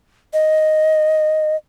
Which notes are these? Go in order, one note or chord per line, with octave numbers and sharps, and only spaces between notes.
D#5